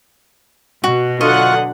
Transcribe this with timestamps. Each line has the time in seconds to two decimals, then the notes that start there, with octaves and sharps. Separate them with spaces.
0.84 B2 F#4
1.21 D3 F#3 F4 D#5 F#5 C#6